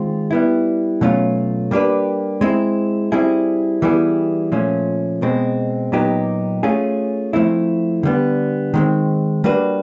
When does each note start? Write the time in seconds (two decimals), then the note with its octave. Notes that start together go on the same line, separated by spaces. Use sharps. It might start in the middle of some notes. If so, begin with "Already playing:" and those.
Already playing: D#3 G#3 C4 F4
0.31 G3 B3 E4
1.01 B2 F#3 A3 C#4 F4
1.71 G3 A#3 D4 G4 B4
2.41 G#3 C4 E4
3.12 G3 C4 E4 G#4
3.82 E3 G3 B3 E4 G#4
4.52 A#2 F3 A3 C#4
5.22 B2 G#3 C4
5.92 A#2 F#3 B3 D#4 G4
6.63 A3 C#4 F4 G#4
7.33 F3 A3 C4 E4
8.03 D3 G3 B3
8.74 D#3 G#3 C4
9.44 G3 A#3 D4 F#4 B4